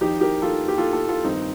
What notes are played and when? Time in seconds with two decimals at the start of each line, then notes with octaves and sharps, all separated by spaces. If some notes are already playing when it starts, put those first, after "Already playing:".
0.01 F2 D#3 D#4 G4
0.21 G4 A#4
0.42 F4 A4
0.68 G4
0.78 F4 A4
0.93 F4 A4
1.09 F4 A4
1.24 G2 D#3 C4 D#4